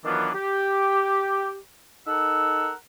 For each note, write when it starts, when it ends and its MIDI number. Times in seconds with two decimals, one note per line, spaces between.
0.05 0.30 51
0.05 0.30 52
0.05 0.30 54
0.05 0.30 59
0.05 0.30 62
0.05 0.30 65
0.35 1.56 67
2.07 2.72 63
2.07 2.72 69
2.07 2.72 70
2.07 2.72 78
2.07 2.72 88